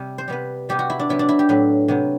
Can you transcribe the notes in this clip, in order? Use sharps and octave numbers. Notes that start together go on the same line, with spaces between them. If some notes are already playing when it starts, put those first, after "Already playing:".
Already playing: C3 G3
C5
C3 G3 B3 B4
C3 G3 B3 G4
F#4
E4
D4
C3 F#3 B3 E4
D4
E4
G4
A2 F#3 C4 B4
C3 F#3 B3